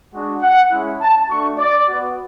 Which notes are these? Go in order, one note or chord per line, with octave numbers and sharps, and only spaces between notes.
G#3 D4 F#4
F#5
G#3 C#4 E4
A5
A3 D4 F#4 C#6
D5
B3 F#4